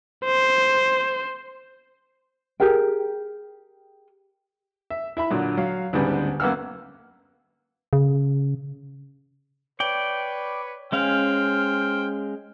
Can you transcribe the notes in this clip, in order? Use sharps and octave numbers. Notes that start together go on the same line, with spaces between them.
C5
G4 G#4 A#4 G5
E5
E4 E5 B5
A#2 D3 F#3
F#3 F5
D2 G#2 C#3 G3 B3
F#2 A#3 B3 F#5 E6 F6
C#3
B4 C#5 D5 G5
G#3 C#4 C5 F5 G5 F6